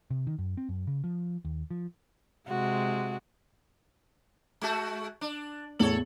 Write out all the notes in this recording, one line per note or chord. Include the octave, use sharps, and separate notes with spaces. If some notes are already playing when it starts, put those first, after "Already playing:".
C3
D#3
F#2
C4
F#2
C#3
F3
D#2
F3
C3 G#3 F#4
G#3 A3 F#4
D4
E2 A2 A4 C#5 F#7